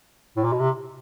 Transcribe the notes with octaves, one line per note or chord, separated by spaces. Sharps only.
A2
A#2
B2
C3